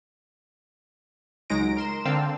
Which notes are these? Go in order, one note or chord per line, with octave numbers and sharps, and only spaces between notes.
C#2 F#3 G#3 D#4 A#6 D7
A#4 C6 E7
D3 C4 F5 G5 A5 E6